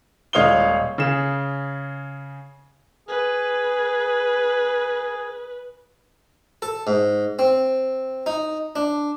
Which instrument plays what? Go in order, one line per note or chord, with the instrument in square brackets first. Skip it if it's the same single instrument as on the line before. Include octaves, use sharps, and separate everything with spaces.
[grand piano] D#1 G#3 C#5 F5 D#6 G7
C#3 G#4 E7
[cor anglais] G#4 [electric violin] B4
[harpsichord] A4
G#2
C4
D#4
D4